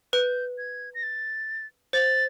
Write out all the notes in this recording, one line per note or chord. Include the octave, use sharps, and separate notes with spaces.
B4 G6
G#6
A#6
A6
C5 A6